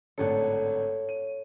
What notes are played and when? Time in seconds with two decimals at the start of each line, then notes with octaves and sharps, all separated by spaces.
0.18 G#1 A2 D3 A4 C#5 F#5 G5
1.09 D#7